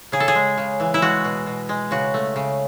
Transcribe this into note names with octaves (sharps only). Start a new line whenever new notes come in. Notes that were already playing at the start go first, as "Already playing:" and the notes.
C#3 G#4
A4
G#4
G#3
C#3
E3
E4
G#3 F#4
B2
B2
G#3
C#3 F#4
A3
C#3